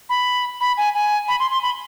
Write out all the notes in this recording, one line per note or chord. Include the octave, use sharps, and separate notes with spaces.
B5
B5
G#5
G#5
B5
C6
C6
B5